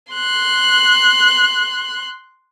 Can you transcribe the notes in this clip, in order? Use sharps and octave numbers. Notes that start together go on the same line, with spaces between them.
C6 F#6